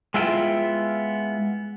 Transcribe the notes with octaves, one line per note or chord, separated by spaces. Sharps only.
G#3 B3 E4 F4 G5